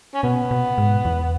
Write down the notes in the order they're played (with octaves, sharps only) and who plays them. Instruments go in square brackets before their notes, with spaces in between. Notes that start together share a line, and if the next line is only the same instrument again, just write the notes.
[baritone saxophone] C#4
[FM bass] B2 [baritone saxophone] B3
[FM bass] B2
G#2
E2